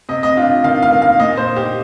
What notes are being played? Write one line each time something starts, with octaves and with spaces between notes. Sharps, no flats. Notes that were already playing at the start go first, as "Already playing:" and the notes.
C3 D#5
D#5
D4 F4
D#3 F5
F5
A#3
F5
A#2 D#5
C5
D#4
G4